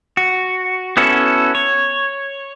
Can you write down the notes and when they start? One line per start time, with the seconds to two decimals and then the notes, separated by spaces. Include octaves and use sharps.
0.17 F#4
0.97 B3 C#4 E4 F#4 A4
1.55 C#5